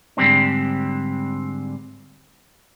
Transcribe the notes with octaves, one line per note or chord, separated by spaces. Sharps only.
G#2 D3 G3 C4 D4